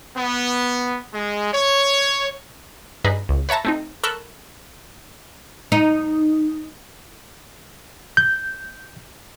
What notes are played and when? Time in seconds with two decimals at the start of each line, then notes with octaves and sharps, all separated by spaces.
0.17 B3
1.14 G#3
1.54 C#5
3.04 G2 D#4 G#4 B4
3.29 C#2
3.49 B4 C#5 E5 A5 A#5
3.65 A3 C4 D#4
4.03 A4 A#4 B5 C#6 F#6
5.72 D#4
8.17 G6